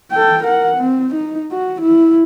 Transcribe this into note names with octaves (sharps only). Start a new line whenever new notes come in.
A4 G5
A#4 F#5
C4
D#4
F#4
E4